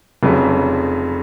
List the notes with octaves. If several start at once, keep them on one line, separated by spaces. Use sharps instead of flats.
F1 F2 C#3 F#3